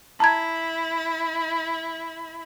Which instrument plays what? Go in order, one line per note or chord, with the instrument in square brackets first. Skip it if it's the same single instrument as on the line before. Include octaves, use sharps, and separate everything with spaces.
[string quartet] E4 [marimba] A5 A#5 G#6